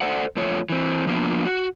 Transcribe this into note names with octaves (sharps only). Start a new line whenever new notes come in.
A4 C5 D5 F#5
F2 A3 F4 C#5
E3 C4
F3 A#3 B3 D4 F4
F#4